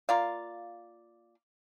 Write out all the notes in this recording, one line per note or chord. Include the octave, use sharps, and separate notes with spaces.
A#3 F4 D5 F5